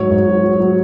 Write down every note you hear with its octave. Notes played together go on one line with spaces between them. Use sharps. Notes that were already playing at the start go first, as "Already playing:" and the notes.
Already playing: G#2 F#3 C#5
G#2
F#3
F#3
F#3